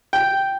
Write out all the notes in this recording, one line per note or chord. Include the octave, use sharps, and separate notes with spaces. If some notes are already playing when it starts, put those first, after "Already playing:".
G5